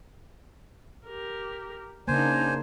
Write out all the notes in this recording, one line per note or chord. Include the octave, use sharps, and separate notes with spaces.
G4 A#4
C#3 A#3 D4 D#4 C5 G#5